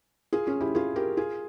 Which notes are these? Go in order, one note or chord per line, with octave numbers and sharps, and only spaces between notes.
F4 G#4
C#4 F4
E4 G4
F4 G#4
G4 A#4
F4 G#4